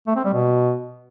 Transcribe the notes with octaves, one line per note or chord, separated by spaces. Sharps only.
A3
C4
G3
B2